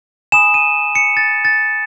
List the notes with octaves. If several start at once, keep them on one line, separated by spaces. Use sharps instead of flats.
G#5 B5 D#6 E7
D#7
C#7
A6
A6